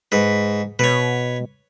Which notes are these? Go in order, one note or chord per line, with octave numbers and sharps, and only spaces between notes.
G#2 B4
B2 B4 C#5